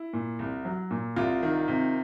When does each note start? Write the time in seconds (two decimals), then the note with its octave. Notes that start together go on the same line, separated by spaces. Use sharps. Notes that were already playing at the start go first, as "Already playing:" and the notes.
Already playing: E4
0.13 A#2
0.39 C2
0.65 F#3
0.91 A#2
1.16 C2 F4
1.43 D#3
1.68 C3